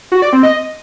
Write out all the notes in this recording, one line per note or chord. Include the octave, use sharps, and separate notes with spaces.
F#4
D5
C4
D#5